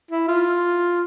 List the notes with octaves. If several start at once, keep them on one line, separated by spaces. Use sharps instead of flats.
E4
F4